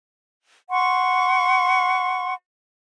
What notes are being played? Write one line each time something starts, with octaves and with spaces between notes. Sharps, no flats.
F#5 C6 C#6